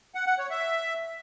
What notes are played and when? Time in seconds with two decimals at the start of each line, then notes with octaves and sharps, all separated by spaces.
0.15 F#5
0.27 F#5
0.39 C#5
0.50 E5